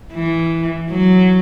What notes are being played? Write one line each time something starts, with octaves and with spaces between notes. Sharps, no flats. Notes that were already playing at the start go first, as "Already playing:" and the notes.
E3
F#3